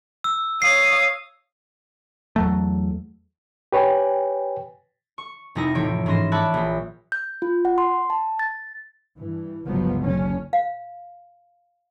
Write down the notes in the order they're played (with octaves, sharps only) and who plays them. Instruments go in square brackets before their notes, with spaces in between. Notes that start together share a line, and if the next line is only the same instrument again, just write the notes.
[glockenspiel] E6
[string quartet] C#5 F5 D#6 [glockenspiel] C7
[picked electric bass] E2 F#3 A3
[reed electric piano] G4 B4 C#5 G5 G#5
[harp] C#6
F1 G3 D#4 E4 G#5 A#6
A1 F3 C#5 D7
G#2 E3 C#4 C6 A#6 E7
C#5 D5 E5 A5 B5 F#6
A#1
[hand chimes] G6
F4
F#5
C6
A5
A6
[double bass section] G2 E3
G1 C#2 F3 F#3 G#3 B3
F#1 D3 C#4
[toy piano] F5